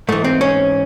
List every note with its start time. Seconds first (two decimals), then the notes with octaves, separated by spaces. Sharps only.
0.09 G#2 E3 A3
0.24 C4
0.41 C#4